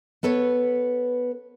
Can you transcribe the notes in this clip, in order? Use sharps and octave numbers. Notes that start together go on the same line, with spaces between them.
B3 A4 B4 C#5